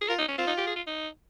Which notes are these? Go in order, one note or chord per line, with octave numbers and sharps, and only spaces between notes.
G#4
F4 A#4
D#4
C#4
C4 F4
D#4
G4
G#4
F4
D#4